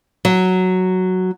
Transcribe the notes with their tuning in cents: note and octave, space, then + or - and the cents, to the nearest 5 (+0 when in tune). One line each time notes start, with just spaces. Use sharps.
F#3 +0